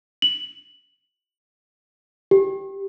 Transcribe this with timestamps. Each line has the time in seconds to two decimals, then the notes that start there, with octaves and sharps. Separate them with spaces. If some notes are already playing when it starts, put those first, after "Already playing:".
0.22 F#7
2.31 G4